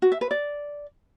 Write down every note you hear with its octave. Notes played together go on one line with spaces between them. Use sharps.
F#4
E5
B4
D5